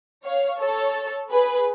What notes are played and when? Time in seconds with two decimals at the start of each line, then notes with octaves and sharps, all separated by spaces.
0.24 C#5 F5
0.60 A4 C#5
1.31 G#4 B4